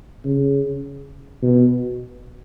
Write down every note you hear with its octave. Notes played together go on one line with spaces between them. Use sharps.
C#3
B2